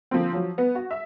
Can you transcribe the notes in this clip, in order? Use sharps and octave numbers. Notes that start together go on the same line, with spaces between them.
D3 F3 A#3 C4
F3 F#3
B3
F#4
E5